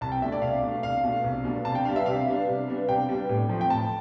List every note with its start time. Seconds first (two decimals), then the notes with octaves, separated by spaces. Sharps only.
0.01 C2 A5
0.12 G5
0.21 B2 A3 D4 E5
0.32 D5
0.42 C2 F5
0.62 B2 A3 D4
0.83 C2 F5
1.04 B2 A3 D4
1.24 C2
1.44 B2 A3 D4
1.65 C3 A5
1.75 G5
1.85 G3 B3 D4 F5
1.96 E5
2.06 C3 F5
2.27 G3 B3 D4
2.48 C3
2.68 G3 B3 D4
2.88 C3 G5
3.09 G3 B3 D4
3.29 A2
3.49 F3 A3 C4
3.61 G5
3.70 A2 A5